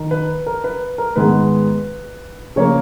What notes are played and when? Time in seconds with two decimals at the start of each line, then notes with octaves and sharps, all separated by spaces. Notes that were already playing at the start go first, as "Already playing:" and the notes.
Already playing: D#3
0.11 B4
0.46 A#4
0.64 B4
0.98 A#4
1.16 G#2 D#3 G#3 B3 B4
2.56 C#3 F3 A#3 C#5